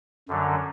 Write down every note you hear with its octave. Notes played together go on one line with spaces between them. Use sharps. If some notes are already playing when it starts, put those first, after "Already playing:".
F#2 D3 F#3